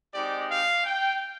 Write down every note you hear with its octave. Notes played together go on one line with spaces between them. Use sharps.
G#3 C4 D#4 G4 D5
F5
G5